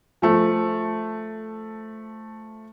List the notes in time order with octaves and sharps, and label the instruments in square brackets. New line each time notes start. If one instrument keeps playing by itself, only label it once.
[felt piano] F3 A3